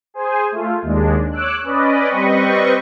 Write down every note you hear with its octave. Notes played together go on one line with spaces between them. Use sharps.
G#4 C5 G#5
A3 F4
D#2 G#3 D4
C#5 D6 E6 F#6
C#4 B4 D5 D#5
G3 C4 B4 D#5 C#6